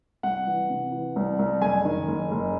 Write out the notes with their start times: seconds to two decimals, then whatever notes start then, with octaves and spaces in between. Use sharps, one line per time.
0.23 C2 F#5
0.47 E3
0.70 C3
0.92 E3
1.16 C2
1.39 C2
1.61 F#1 G#5
1.85 D#3
2.08 F#1
2.31 F#1